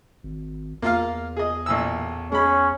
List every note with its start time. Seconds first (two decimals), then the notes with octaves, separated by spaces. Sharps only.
0.23 G#1
0.82 E2 A#3 F4 F5
1.36 G#4 D#5
1.66 A1 A#2 E6
2.32 G#3 C#4 B5